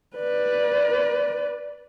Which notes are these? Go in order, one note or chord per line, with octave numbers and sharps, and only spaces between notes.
B4 D5